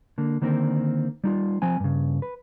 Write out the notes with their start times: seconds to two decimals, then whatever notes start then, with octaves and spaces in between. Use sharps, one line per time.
0.18 D3 A#3
0.42 D3 D#3 A#3 C4 A4 A#4
1.24 G3 D#4 F4
1.62 F3 C4 G#5
1.80 G2 C#3
2.22 B4